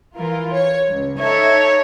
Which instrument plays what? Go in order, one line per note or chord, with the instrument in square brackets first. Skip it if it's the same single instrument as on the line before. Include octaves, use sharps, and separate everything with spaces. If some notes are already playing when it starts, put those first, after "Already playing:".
[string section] E3 F4 A#4
C#5
C#2
[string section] D#4 A4 E5 [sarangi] C#5